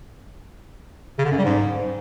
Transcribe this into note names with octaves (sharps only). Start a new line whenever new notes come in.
C#3
D3
F#2
G3
G#2